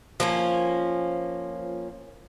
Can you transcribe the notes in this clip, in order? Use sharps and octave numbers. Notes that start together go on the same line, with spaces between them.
F3 A#3 C#4